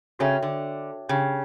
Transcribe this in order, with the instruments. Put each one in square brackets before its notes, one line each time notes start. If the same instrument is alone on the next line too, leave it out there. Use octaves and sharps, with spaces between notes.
[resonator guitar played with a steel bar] C#3 C#4 [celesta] F#4 A4 C#5 E5 G5
[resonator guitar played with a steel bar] D3
[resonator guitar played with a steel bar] C#3 [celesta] D4 G4 C#5 G5